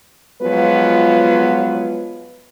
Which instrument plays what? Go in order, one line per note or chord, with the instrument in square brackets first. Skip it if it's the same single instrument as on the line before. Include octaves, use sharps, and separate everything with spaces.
[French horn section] F3 F#3 G#3 B3 F4 B4